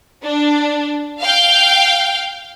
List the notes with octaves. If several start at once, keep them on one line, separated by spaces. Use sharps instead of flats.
D4
F5 G5